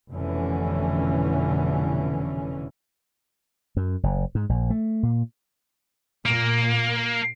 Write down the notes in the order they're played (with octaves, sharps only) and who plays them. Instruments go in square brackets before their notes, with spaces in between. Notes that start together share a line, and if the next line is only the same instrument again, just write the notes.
[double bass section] F1 B2 D3 E3 C#4
[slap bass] F#2
F#1
G#2
A#1
A3
A#2
[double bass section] A#2 [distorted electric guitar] A#3